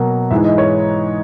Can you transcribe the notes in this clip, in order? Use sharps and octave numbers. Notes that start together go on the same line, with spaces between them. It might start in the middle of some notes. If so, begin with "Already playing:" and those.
Already playing: B2 F#3 A#3
G#2 E3 G#3 E5
D#5
C#5